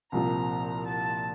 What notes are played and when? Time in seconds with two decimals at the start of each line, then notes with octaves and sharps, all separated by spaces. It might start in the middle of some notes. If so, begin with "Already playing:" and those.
0.12 C2 A#2 F3 C4 F4 A#5
0.87 A5